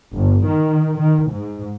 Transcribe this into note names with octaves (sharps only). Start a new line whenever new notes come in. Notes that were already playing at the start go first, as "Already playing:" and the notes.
G1
D#3
D#3
G#2